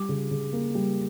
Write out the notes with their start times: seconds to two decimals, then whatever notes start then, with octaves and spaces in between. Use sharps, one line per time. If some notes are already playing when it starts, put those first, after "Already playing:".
Already playing: G3 D6
0.09 C#3
0.31 C#3
0.53 A#3
0.75 G3